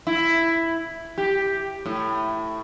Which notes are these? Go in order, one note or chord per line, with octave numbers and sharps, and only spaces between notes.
E4
G4
A2